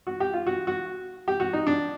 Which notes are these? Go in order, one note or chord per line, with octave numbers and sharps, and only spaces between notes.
F#4
G4
F4
F#4
F#4
G4
F#4
D#4
D4